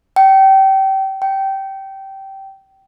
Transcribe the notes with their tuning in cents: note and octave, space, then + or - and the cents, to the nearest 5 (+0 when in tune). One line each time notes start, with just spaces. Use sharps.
G5 -25
G5 -15